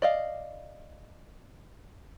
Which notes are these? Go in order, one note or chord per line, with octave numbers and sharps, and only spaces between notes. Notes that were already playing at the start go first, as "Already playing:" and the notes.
D5 D#5 F5